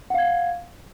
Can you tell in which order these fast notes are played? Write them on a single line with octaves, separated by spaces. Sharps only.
F#5 F5 G#6